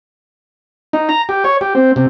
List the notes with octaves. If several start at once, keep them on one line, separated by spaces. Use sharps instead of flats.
D#4
A#5
G4
C#5
G4
C4
C3